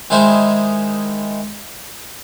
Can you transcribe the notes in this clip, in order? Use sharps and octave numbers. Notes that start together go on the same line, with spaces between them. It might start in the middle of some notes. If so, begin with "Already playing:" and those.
D#3 G#3 D#4 E4 G#4 C5